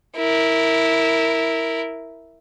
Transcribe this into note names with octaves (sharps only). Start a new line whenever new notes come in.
E4 A#4